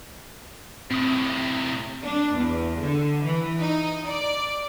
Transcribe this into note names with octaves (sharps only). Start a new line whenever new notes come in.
A2 C3 C4 D#6
D4
E2
D3
E3
D#4
D5